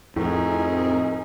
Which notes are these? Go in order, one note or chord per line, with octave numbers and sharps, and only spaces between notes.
F2 A2 C4 D#4 G#4 A#4